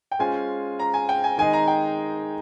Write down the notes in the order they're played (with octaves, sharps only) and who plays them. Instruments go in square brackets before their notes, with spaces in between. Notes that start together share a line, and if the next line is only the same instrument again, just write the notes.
[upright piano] G5
[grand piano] G#3 C#4 F4 C5 [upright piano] G#5
[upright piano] A#5
G#5
G5
G#5
[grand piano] D#3 G#3 D#4 G#4 D#5 [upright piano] G#5
[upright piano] A#5
G5